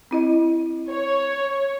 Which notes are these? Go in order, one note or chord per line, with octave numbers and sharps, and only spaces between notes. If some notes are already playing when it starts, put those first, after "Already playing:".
C4 E4 D#5
C#5